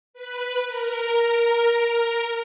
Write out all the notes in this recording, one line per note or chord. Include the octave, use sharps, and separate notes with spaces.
B4
A#4